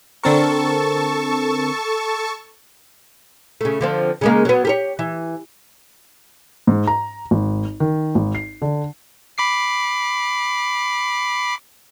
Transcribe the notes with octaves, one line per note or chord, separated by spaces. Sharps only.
D3 C4 A4 A#4 A5 C#6
C#3 A3
D3 F3 C4
C#3 G#3 A#3
F#3 B3
G4 A4 C#5
E3
G#2
A#5
G#1
D#3
G#1
C7
D3
B5 D6 C7